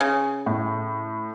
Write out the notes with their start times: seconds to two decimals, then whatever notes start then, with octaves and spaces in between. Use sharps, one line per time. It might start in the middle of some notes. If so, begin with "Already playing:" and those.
0.01 C#3
0.46 A2